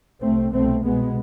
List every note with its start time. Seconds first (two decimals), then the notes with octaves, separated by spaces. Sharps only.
0.21 C2 C3 A3 C4
0.52 C2 B2 A3 C4
0.83 C2 B2 G#3 B3